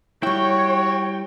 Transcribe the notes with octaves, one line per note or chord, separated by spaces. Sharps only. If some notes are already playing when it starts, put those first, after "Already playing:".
G3 E4 F#4 C#5 G5